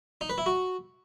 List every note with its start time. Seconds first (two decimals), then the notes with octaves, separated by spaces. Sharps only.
0.21 D#4
0.29 B4
0.38 E4
0.46 F#4